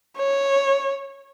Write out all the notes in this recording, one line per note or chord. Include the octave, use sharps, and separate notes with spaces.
C#5